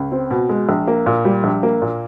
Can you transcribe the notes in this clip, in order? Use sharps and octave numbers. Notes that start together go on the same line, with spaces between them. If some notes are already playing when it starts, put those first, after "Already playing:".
Already playing: C#2
C4
B2
G#3
A#1
A#3
A#2
G3
A#1
A#3
A#2